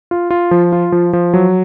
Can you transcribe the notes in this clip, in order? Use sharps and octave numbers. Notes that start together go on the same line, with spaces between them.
F4
F4
F3
F4
F3
F3
F#3